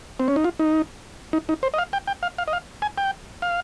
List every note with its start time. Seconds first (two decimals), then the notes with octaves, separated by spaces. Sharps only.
0.20 C4
0.28 C#4
0.36 D#4
0.44 F4
0.59 D#4
1.33 D#4
1.49 D#4
1.63 C5
1.74 D#5
1.78 F5
1.93 G5
2.08 G5
2.23 F5
2.38 F5
2.48 D#5
2.53 F5
2.82 G#5
2.98 G5
3.42 F5